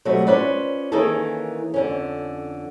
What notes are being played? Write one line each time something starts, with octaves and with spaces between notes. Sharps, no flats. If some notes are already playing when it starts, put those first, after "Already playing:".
B2 F#3 G3 A3 C4
C#4 F4 B4 C5 D5
D#3 E3 A#3 C#4 G#4 A4
F2 D3 C#4